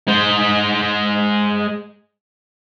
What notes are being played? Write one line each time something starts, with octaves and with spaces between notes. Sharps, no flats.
G#3 C5